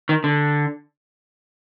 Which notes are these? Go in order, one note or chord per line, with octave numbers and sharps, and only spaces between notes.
D#3
D3